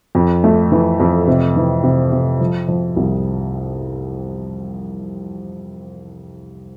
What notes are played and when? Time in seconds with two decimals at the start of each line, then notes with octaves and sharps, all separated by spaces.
0.15 F2
0.44 A3
0.72 E3
1.00 F2
1.27 C3
1.56 E3
1.84 C3
2.12 C3
2.41 F3
2.68 F3
2.96 C2